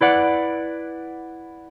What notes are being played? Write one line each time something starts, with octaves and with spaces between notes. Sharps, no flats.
E4 B4 D5 F#5